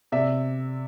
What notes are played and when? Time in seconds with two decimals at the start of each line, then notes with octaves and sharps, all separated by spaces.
0.12 C3 D5 E5